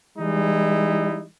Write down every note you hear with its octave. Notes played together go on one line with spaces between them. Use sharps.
E3 G3 G#3 D#4 E4